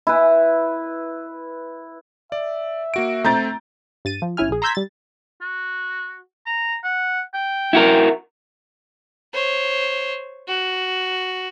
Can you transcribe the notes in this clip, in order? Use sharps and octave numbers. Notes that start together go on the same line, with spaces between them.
E4 B4
D5 E5
A#3 F#4 D7
A3 C4 A#5 G6 A6
G2 A6 D#7
F3
G1 C#4 E4 G#5 F6
A#1 G#4
A#5 C6 E6 G6 G#6 B6
G3 A6
F#4
A#5
F#5
G5
E4 F#4 A#4
C5 C#5
F#4